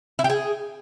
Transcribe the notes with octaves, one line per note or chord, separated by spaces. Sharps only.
E4
G4
G#4